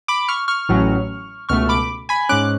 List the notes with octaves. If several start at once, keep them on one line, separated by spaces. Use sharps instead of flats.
B5 D6
C#6 F6
C#6 F6
A1 A2 F#3 C#4
C#2 B2 A3 C#6 F6
B5 D6
G#5 B5
G#2 G#3 C#4 D6 F#6